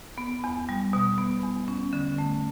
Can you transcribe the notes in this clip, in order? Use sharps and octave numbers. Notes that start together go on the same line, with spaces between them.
B3
E2
G3
B2
B3
E2
C#4
D3
A3